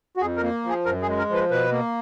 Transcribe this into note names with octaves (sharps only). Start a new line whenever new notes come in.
F#4
F2 G#4
A#4
A#3
F3 G#4
F#2 A#4
G#4
G#3
A#4
F3 B4
B2 B4
A#3